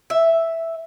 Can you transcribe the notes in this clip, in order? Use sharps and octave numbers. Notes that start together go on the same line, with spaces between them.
E5